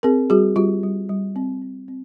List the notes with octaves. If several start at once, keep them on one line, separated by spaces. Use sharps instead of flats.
C4 G#4 A#4
G3 F#4 G#4
G3 F4 G4
G3
G3
C4
C4
C4